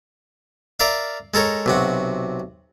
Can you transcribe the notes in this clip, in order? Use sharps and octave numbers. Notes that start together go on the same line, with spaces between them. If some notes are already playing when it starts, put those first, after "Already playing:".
A#4 D5 E5 F5
G#3 A4 A#4 C#5
B1 C3 F#4